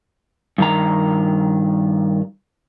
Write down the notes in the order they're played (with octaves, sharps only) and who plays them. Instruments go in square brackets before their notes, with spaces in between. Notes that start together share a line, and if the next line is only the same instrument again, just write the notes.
[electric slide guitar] G2 D#3 A#5